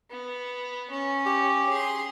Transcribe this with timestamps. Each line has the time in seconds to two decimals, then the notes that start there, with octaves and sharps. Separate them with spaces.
0.11 B3
0.90 C#4
1.26 G4
1.69 G#4 C6